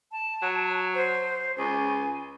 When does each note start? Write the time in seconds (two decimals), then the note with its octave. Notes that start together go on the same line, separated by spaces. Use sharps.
0.12 A5
0.42 F#3
0.95 C5
1.58 C#2 G#5